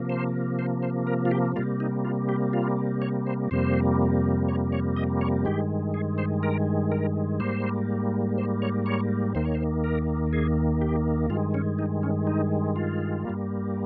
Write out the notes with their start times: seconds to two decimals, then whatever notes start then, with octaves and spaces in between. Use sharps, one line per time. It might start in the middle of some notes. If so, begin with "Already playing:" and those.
Already playing: C3 F3 A#3
0.09 C5
0.59 C5
0.82 C5
1.07 A#4
1.25 F4
1.31 G4
1.56 C3 G3 A#3 F4
1.80 D#4
2.05 F4
2.29 G4
2.53 F4
3.02 C#5
3.26 C5
3.51 F2 C3 G3 A#3 C5
4.48 C#5
4.72 C#5
4.96 D#5
5.21 C#5
5.45 G2 D#3 G#3 G4
5.94 G#4
6.18 C5
6.43 A#4
6.92 A#4
7.40 G#2 G3 A#3 C5
8.38 C5
8.62 C#5
8.86 C#5
9.35 D#2 D#3 A#3 C5
9.45 C#5
9.55 C5
9.84 A#4
10.33 G#4
10.81 G4
11.30 G2 D#3 G#3 F4
11.54 C#4
11.79 D#4
12.03 C#4
12.27 D#4
12.76 F4
13.25 G2 G3 A#3